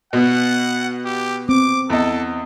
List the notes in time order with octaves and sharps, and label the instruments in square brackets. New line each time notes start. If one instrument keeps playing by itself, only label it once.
[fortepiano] B2 B3 [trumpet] F#5
[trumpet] G4
[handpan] C4 [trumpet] D6
[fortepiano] E2 D#5 [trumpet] A4